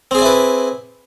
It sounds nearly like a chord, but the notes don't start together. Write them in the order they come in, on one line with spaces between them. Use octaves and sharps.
C4 G#4 D5 E4 B4